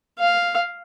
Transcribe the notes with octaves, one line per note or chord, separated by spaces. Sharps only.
F5